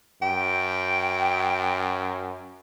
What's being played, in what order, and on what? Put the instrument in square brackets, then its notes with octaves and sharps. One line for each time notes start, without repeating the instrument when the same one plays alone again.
[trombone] F#2 [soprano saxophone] G5